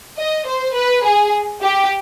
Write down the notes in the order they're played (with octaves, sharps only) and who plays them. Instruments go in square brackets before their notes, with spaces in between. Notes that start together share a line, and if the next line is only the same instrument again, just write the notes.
[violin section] D#5
C5
B4
G#4
G4